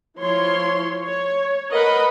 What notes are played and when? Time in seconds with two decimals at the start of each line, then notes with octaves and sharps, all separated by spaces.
0.17 F3 E4 C#5 C6
1.01 C#5
1.71 A#4 B4 D#5 F#5 B5